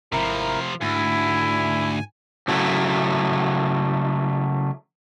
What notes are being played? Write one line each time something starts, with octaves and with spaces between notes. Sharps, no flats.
G#1 C3 F3 E4 A#4 A#5
D2 G#2 E4 G#5
C#3 F#3 A3 E4